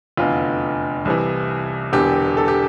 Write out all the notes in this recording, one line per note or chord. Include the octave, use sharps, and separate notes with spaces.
F1 E2 D3 F4
C2 C3 E3
E1 E2 D3 G4
A4
G4